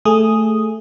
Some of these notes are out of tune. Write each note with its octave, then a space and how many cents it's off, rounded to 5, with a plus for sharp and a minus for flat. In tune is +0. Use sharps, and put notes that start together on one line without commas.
A3 +0 G#4 +0 D#6 +0